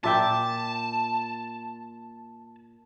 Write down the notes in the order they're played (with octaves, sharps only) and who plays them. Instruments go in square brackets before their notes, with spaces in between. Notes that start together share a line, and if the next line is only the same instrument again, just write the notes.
[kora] A#2 E5 G5 [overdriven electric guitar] A5